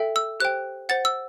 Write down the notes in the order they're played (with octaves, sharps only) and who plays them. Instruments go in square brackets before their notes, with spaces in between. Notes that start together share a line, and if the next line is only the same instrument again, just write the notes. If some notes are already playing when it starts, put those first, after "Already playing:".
Already playing: [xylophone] A4 E5 G5
E6
G4 C5 G5 F#6
C5 F#5 A6
E6